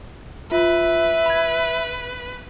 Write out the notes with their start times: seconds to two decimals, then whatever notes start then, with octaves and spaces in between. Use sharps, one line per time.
0.52 F4 B4 E5
1.26 B5 G#6